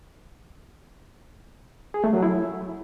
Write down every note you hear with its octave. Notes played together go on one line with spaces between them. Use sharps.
G#4
A3
F#3
E4